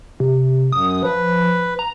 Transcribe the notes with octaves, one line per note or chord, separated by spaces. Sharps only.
C3
F#2 D#6
F3 B4
A#5